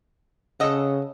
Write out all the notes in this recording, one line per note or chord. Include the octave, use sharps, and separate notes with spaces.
C#3 A4 D#5 F#5